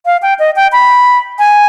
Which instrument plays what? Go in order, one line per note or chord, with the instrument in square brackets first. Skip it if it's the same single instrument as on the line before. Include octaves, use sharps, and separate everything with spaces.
[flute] F5
G5
D#5
G5
B5
G#5